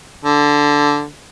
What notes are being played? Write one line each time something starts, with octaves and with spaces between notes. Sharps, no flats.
D3